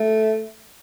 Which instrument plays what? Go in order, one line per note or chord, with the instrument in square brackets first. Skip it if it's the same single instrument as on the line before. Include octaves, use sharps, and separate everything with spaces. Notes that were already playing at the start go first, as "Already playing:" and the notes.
Already playing: [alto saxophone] A3